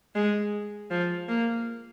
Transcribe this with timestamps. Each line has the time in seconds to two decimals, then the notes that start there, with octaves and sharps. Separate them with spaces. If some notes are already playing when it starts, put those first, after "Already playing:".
0.15 G#3
0.90 F3
1.29 A#3